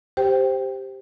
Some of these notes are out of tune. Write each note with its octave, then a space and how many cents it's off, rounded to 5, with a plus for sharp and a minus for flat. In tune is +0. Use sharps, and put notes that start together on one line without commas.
G4 +0 C5 +0 G5 +0